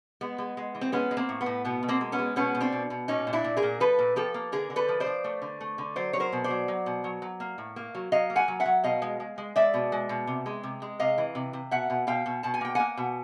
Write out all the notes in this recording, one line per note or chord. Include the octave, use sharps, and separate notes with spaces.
G#3 B3
G#3
G#3
E3
C4
G#3 B3 C#4
G#3
A#3 C4
A2
B3
A2
B2 B3
B2
A#3 C4
G#3
B3 C#4
G#3
B2 B3 C#4
B2
C4 D4
B2
B2
A#2 C#4 D#4
A#2
D4 E4
A#2
G#4 A#4
A#2
F3 A4 B4
A#2
F3 G4 A4
A#3
D3 G#4 A#4
D3
A4 B4
F3
C5 D5
F3
A3
D3
A3
D3
F#3 C5 D5
F#3 C#5
A#4 C5
B2
C5 D5
F#3
F#3
B2
F#3
F#3
A#3
A2
A#3
F#3
F#3 D#5 F5
A#3
F#5 G#5
F#3
E5 F#5
F#3
B2 D#5 F5
G#3
G#3
G#3
G#3 D5 E5
B2
G#3
B2
C3
G#3
C3
G#3
C3 D#5 F5
E3
C3
C3
B2 E5 F#5
B2
B2 F5 G5
B2
B2 A5
G#5
A#3 G5
A#3 F#5 G#5
B2